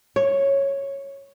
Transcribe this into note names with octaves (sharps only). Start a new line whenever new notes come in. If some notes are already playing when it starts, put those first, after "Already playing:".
C#5